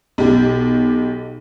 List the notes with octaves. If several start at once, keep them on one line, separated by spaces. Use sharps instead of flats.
B1 G4